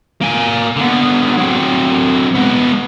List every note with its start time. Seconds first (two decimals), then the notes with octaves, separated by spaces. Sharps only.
0.21 A#3 G#5
0.76 D3 B3
1.37 F#3 C4
2.35 G#3 B3